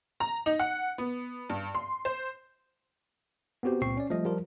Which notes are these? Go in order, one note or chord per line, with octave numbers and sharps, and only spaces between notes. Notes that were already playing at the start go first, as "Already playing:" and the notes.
A#5
D#4
F#5
B3
G2
C6
C5
B3 C4 F#4 G4 C5
C#2 A#2 C4 C#6 C7
C#4 D5
F3 G3 A3 D#5
F3 G3 F4 A#4